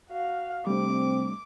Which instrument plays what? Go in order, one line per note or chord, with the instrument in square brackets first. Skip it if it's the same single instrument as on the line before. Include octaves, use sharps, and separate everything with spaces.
[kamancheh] F#4 F5
[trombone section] C3 C4 [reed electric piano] G3 A3 D4 [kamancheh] D6